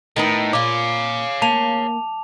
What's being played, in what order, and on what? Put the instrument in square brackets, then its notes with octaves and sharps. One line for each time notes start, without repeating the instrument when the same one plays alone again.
[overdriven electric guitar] A2 [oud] D#3 B3 D#4
[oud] A#2 F4 [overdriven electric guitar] C#5 F5 [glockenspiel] D6
[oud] A#3 [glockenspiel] A5 F7